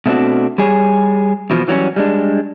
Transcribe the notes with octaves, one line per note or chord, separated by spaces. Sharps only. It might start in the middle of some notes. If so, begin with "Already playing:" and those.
B2 A3 C4 D4 F#4
G3 G#4 C#5
E2 B2 D3 F3
E3 F#3 G3 A3 C#4
G3 G#3 D4